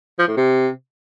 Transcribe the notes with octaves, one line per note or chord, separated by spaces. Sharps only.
F3
A2
C3